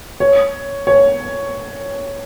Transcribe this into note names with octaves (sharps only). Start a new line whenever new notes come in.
C#5
C#5